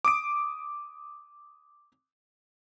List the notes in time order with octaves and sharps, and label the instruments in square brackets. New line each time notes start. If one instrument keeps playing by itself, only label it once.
[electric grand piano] D6 D#6 D7